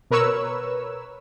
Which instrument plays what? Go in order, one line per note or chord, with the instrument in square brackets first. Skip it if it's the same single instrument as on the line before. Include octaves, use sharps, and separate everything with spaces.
[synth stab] B2 A#4 B4 C#5 E6